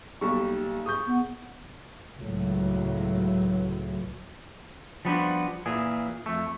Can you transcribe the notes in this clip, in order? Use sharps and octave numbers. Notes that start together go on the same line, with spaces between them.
B1 G3 A#3 D#4 C#6
G#4 C#6 D#6 G6
B3
C#2 A2 F#3
F3 G3 B3 D4 F#4 C5
A#2 E3 G#4
F2 A3